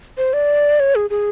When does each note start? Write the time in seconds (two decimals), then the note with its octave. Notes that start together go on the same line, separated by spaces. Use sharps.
0.17 C5
0.33 D5
0.80 C#5
0.95 G#4
1.10 G#4